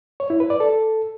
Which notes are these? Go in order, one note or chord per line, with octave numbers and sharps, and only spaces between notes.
C#5
E4
B4
D5
A4